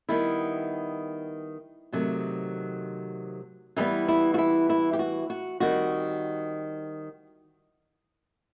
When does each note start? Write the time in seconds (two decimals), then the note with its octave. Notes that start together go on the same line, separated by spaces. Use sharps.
0.09 D#3 G3 B3 E4
1.92 C3 D#3 F#3 A3
3.76 E3 G3 B3 D#4
4.08 E4
4.34 F#4
4.38 E4
4.69 E4
4.93 G4
4.99 F#4
5.30 F#4
5.60 D#3 G3 C4 F#4